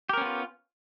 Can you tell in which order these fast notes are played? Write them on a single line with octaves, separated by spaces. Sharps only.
G4 A#4 C#4 B3 F4